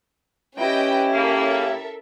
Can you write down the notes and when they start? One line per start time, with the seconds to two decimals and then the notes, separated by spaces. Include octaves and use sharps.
0.58 C#4 E4 G4 B4 D#5 G5
1.15 C#3 A#3 A4 A#4 E5